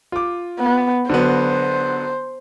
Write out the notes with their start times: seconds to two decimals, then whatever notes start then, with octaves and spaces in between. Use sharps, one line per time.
0.12 F4 D6
0.59 B3
1.10 D3 F#3 B3 C5